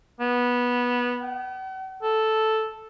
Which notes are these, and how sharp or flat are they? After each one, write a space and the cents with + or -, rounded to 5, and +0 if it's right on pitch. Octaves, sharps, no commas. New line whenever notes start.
B3 -15
F#5 +45
A4 -5